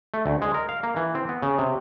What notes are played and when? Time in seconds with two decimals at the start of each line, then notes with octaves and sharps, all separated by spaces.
0.14 A3
0.26 D2
0.42 G#3
0.54 A#4
0.69 F5
0.83 A#3
0.96 E3
1.15 C4
1.29 B3
1.42 C#3
1.58 C3